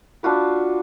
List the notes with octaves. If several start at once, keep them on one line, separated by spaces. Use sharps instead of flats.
D4 F4 F#4 B4